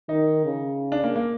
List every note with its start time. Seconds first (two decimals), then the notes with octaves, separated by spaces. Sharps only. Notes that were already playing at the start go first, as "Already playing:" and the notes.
0.09 D#3 D#4
0.45 C#3
0.92 D4
1.04 A#3
1.16 A#3